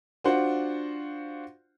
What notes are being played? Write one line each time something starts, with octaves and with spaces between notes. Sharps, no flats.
D4 F4 F#4 C5 F#5